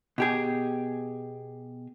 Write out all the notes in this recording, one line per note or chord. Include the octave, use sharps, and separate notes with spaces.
B2 G4 G#4